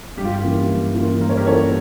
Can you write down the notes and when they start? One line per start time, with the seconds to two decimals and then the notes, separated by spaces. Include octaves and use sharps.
0.17 G2 G4
0.25 F4
0.33 G4
0.44 E3 A#3 C#4 F4
0.70 G2
0.95 E3 A#3 C#4 F4
1.20 G2 A#4
1.29 C#5
1.37 G4 A#4
1.46 E3 A#3 C#4 F4 A4 C#5